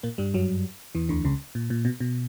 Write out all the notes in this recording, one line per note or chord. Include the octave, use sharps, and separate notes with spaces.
A#2 A#3
G2 G3
F#2 F#3
E2 E3
D2 D3
C#2 C#3
A#2
A#2
B2
B2